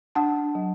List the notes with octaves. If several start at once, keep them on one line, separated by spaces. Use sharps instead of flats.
D4 F#5 A5
F#3